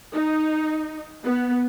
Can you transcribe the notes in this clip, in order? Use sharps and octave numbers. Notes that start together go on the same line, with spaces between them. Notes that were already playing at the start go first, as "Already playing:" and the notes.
D#4
B3